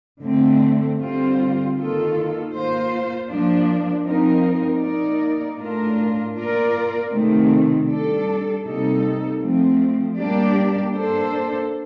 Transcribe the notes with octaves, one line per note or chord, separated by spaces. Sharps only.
D3 A3 C4
D3 G3 C4 F4 C5
D#3 A#3 F4 A4
A#3 F4 C5
F3 A#3 D4
F3 C4 D#4 A#4
A#3 D#4 A#4 D5
A2 A3 D4 F4 A#4
A#3 F4 A#4 D5
C3 D#3 A3 C4
G3 D4 A4 D5
C3 G3 A#3 D#4 A4
F3 A3 C4
G3 A#3 D4 G4 D5
A#3 D4 A4 C5